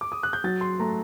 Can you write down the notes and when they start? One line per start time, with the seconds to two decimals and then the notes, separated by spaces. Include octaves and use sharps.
0.01 D6
0.12 D#6
0.23 F#6
0.33 G6
0.44 F#3 A6
0.61 C6
0.80 A3 A#5